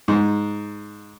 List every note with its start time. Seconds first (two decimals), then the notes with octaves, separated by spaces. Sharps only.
0.08 G#2